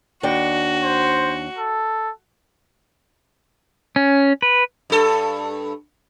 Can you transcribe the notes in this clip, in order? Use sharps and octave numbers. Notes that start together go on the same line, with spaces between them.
D#2 D4 F#4 G5
C5
A4
C#4
B4
G2 A4